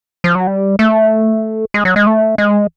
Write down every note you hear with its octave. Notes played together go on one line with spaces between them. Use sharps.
F3
F#3
G3
A3
G#3
F#3
G#3
A3
G#3